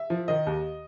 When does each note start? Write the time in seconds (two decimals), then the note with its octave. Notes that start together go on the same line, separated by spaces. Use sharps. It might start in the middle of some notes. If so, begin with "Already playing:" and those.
Already playing: E5
0.10 F3
0.28 D#3 D#5
0.47 D#2